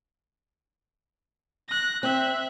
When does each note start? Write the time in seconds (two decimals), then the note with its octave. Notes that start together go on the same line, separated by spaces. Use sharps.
1.69 F#6 A#6
2.03 C4 E5 F#6